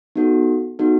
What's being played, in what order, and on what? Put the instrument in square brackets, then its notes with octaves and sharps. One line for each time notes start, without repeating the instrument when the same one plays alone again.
[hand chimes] B3 D#4 F#4 A4
B3 D#4 F#4 A4